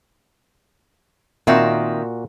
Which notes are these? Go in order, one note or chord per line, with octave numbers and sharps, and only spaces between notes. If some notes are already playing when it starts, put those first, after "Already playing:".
A#2 D#3 C4 F#4 E5